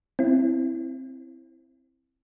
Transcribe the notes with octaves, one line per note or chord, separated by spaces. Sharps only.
C4 E4